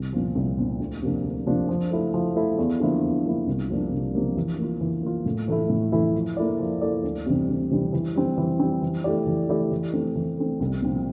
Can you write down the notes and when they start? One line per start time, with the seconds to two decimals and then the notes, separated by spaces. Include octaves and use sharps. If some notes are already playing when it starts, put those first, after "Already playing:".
Already playing: C2
0.13 A#2 F3
0.35 C2
0.58 A#2 F3
0.79 D2
1.02 C3 F3 A#3 D4
1.24 D2
1.46 C3 F3 A#3 D4
1.69 F3
1.91 A3 E4 A4
2.14 F3
2.35 A3 E4 A4
2.58 E2
2.80 D3 F3 A#3 E4
3.02 E2
3.25 D3 F3 A#3 E4
3.47 C2
3.70 C3 F3 A#3 D4
3.92 C2
4.14 C3 F3 A#3 D4
4.37 E3
4.59 A#3 F4
4.81 E3
5.03 A#3 F4
5.26 A2
5.48 E3 A3 E4
5.70 A2
5.92 E3 A3 E4
6.15 F3
6.37 A#3 E4 A4 D5
6.59 F3
6.82 A#3 E4 A4 D5
7.04 D2
7.26 C3 E3 G3 C4
7.48 D2
7.71 C3 E3 G3 C4
7.93 E3
8.15 G3 C4
8.38 E3
8.60 G3 C4
8.82 E3
9.04 A3 E4 G4 D5
9.27 E3
9.49 A3 E4 G4 D5
9.71 E3
9.93 A3 C4
10.15 E3
10.38 A3 C4
10.60 C2
10.82 A#2 F3 C4